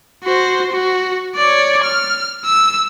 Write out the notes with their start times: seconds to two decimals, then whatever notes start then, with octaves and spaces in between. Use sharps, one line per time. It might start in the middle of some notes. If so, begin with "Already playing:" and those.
0.24 F#4 C5
0.72 F#4
1.35 C#5 D5
1.83 F6
2.45 E6